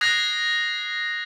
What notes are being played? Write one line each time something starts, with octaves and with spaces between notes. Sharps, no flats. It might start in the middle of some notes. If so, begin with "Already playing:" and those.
D#6 F#6 G#6 A#6 C7